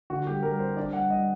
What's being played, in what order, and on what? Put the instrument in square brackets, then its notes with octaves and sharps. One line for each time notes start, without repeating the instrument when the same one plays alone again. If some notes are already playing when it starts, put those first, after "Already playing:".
[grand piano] D3 F#4
G3 G4
G3 A#4
C4 C5
D4 D5
G3 F#5
G3 D#5